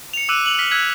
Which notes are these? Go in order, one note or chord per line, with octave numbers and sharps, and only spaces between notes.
C#7 F7
D6 E6 F#6 D#7 F7
F7 F#7
F6 B6
E6 F#6 G#6 B6